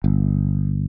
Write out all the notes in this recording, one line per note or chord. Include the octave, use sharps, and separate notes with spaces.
G1